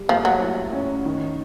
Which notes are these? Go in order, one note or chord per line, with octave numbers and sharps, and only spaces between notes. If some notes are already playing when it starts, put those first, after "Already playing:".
Already playing: G3
F3 A#3
F#3
E4
C#4
D#3